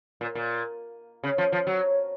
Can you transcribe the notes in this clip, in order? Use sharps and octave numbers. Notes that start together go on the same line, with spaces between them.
A#2
A#2
C#3
F3
F3
F#3